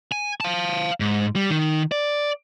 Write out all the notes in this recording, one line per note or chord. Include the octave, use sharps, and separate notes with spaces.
G#5
F5 A5
G#2
G3
D#3
D5